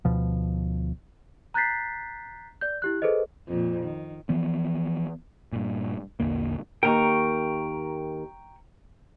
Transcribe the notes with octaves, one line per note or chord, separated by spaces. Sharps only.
D2 B2 F3
A#5 F#6 G6 A6 B6 C7
D5 G6
E4 G4 F#6
G#4 A4 B4 C5 D#5
F2 A#2
D#3
E3 F3 B3
G2 A#2
A#1 E2 D3 A#3
D#2 A#4 G5 A#5 C#6